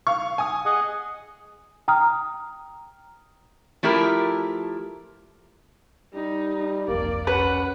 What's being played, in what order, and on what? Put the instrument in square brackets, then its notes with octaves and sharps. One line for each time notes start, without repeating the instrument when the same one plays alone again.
[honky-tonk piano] F5 C#6
G#5 D#6
[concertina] G#4 D#5 F#5
[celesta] G5 A#5 D#6 F6
[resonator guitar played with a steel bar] F3 A3 E4 G4 A#4
[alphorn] G3 [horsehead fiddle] D#4
[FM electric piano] G1 C2 F2 [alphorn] A#3 [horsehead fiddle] D5
[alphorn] C#4 [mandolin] B4 [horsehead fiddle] F#5